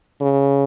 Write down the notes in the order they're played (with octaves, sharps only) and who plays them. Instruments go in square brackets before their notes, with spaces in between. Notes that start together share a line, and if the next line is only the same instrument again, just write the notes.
[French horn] C#3